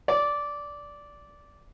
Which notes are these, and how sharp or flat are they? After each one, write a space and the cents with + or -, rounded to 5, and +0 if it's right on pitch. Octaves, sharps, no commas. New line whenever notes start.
D5 -10